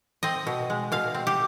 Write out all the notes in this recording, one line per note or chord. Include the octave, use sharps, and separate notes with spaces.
C4 D#5
B2
G#3
B2 F5
C4
G4